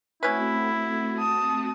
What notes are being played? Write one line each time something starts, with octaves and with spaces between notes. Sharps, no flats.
A3 C4 C#4 E4 F#4 B4
A5 D#6